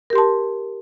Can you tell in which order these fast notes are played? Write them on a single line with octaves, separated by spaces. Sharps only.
A#4 G4 C6 A5